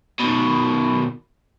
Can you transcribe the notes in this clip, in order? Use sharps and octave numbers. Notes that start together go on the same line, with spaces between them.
B2 D#3